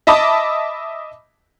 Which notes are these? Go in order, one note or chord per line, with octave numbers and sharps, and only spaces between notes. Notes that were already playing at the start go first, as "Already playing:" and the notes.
D#5 E5 A5 B5 D6 D#6